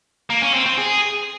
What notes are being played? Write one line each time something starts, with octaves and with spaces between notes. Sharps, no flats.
A#3
C#4
C4
C4
G#4